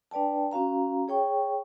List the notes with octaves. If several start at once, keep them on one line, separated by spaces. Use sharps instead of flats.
D4 B4 D5 G5 A5
C#4 F#4 F5 A#5
G#4 C#5 G5 C#6